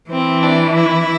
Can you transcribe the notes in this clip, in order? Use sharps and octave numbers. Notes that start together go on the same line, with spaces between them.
E3 C4
D4
E4